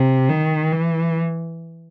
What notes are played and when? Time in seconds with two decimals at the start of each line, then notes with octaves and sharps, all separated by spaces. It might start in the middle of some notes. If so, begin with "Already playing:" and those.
Already playing: C3
0.29 D#3
0.72 E3